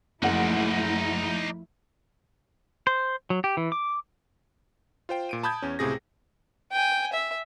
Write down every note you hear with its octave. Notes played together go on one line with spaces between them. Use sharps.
F#1 F3 A3 D#4 E4 D5 F#5
C5
F#3
G4
E3
D6
F4 C5 G5
A#2 D7 D#7
A5 B5 D#6 G6 G#6
E2 C#4
C#2 A2 C3 G#4 A#6
G5 G#5
E5